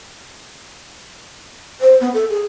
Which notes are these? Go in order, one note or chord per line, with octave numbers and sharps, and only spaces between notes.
C5
B3
A4
G#4